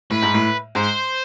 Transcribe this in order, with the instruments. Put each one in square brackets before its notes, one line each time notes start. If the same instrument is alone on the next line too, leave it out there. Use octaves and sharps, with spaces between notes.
[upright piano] A2 [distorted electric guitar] B4
[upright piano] G#2
A2
[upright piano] G#2 [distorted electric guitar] C5